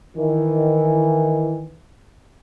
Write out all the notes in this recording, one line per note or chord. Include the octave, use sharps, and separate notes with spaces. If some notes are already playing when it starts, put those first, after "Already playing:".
D#3 E3